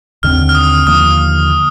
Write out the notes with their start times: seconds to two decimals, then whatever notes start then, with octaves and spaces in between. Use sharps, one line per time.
0.23 D#2 D3 G3 C4 F6
0.49 F6
0.55 D#6
0.87 D#2 D3 F3 A#3 D#6